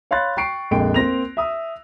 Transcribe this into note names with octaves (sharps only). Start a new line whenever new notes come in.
C#5 F5 B5 C6 F#6 A6
G5 C#6 C7 D7
A#1 F2 G#3 A#3 G5 D7
A#3 C4 A#6 F7
E5 D#6 E6